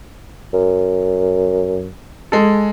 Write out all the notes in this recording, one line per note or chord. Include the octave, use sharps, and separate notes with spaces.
F#2
G#3 A4